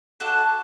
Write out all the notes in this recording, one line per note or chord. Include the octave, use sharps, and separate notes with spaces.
A3 D4 F#4 A4 F#6